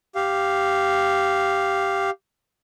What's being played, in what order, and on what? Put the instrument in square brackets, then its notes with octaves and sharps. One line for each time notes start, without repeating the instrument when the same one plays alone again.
[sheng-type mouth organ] G4 F5